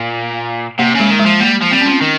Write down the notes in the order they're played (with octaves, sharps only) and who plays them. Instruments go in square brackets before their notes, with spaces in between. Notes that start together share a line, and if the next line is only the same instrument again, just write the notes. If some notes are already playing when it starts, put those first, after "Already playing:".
Already playing: [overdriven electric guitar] A#2
[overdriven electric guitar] C3 [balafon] A#3
[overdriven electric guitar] C#3 [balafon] G#3
[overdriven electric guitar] D#3
[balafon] G#3
[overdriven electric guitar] F3
[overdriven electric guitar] G3 [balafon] A#3
[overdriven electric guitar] F3
[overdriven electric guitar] G3 [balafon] C4
[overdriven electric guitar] F3 [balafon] C#4
[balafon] C4
[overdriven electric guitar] D#3